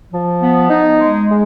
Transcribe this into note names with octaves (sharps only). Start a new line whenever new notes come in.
F3
B3
D#4
G#3
G#3